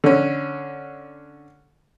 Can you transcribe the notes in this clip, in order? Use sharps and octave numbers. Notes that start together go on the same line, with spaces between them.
D3 C#4